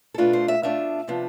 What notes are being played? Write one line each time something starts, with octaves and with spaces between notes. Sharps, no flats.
A4
B2 A3 D4 F4 B4
C5
E5
B2 A3 D4 F4 E5
C3 F3 B3 D4